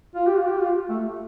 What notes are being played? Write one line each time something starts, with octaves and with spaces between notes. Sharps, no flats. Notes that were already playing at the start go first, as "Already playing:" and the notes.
F4
G4
F4
G4
F4
A3